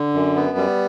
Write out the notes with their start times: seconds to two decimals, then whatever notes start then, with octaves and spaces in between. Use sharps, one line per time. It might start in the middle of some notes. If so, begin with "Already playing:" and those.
Already playing: D3
0.14 F#2
0.35 B3
0.57 G3